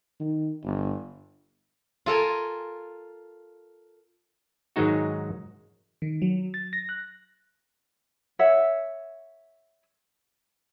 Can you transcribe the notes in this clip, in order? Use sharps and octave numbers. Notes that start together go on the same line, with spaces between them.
D#3
G1
F4 A4 A#4 G#5
G#2 D#3 F#3 G#3 D#4 F#4
D#3
F#3
A6
A#6
F#6
C#5 E5 F#5